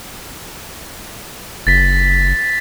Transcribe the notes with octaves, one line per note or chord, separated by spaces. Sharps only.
F#1 A6 B6